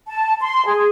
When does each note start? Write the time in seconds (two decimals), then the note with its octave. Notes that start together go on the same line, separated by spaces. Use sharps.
0.07 A5
0.41 C6
0.66 G#4